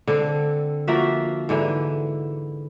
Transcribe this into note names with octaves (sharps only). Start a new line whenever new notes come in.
D3 C4 A4
F3 A#3 F#4 E5
G#2 D3 E3